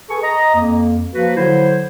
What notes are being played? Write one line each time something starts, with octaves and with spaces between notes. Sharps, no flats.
G#4 A4 B4 G#5 C#6
D#5 A#5
F2 A#3
F3 A#3 F#4 B4
D3 F#3 E4 C5